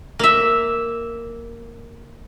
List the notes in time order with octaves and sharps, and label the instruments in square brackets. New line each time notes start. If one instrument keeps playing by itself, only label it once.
[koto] A#3 E5